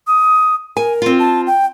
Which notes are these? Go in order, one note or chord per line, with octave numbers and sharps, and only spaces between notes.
D#6
A#4 G#5
C4 F4
A5
G5